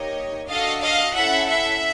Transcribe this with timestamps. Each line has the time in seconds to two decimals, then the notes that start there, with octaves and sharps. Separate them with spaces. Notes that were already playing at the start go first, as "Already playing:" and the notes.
Already playing: A#3 D#4 G4 C#5 D#5
0.48 D4 F#4 A4 D#5 F5
0.81 D#5 F5
1.15 C#4 E4 A4 E5 F#5
1.49 E5 F#5